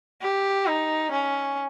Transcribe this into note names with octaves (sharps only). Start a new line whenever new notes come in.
G4
D#4
C#4